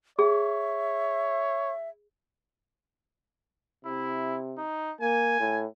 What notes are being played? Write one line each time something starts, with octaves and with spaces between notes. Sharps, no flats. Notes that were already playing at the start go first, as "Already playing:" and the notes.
G#4 C#5 E5
C3 E4
D#4
A#3 G#5
A2